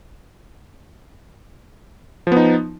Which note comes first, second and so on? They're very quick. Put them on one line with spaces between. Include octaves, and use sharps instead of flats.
F3 B3 D#4